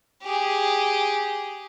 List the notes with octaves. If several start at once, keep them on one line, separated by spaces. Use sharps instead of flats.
G4 G#4